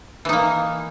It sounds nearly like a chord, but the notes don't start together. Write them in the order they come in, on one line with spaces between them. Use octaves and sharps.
E3 D#4 A#3